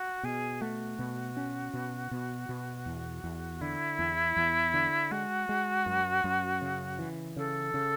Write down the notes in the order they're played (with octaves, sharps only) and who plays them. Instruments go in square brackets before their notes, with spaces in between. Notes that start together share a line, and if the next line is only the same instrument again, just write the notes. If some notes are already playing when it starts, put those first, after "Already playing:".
Already playing: [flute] F#4
[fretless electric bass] B2 [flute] G#4
[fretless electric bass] A3 [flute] F#4
[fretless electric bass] B2
C#4
B2
B2
B2
E2
E2
[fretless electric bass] D3 [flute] E4
[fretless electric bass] E2
E2
D3
[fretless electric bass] G#3 [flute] F#4
[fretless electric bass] G#3
F#2
F#2
C#3
E3
[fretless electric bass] C#3 [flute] A4
[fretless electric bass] C#3